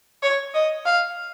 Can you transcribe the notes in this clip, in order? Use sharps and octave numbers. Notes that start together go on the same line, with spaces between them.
C#5
D#5
F5